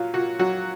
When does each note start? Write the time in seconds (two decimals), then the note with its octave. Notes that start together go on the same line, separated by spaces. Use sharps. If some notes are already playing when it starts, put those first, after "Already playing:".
Already playing: A#2 F#3 F4
0.14 A#2 F#4
0.39 F#3 F#4